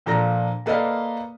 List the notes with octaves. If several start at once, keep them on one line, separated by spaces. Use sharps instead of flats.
A#2 F3 D4 A4 A#5 A#6
A#3 A4 B4 D5 D#5 F5